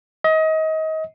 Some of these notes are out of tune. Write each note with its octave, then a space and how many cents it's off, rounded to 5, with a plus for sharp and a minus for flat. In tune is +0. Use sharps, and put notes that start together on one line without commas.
D#5 +30